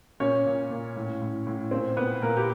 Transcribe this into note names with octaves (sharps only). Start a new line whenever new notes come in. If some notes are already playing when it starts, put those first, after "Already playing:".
A#2 C#4 C#5
A#2
A#2
A2
A2
A2
A#2 C4 C5
A#2 B3 B4
A#2 A#3 A#4
G4